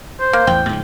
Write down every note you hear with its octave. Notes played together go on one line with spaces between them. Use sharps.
C5
A#3
A1 E2 G5
G#2 C#3 F3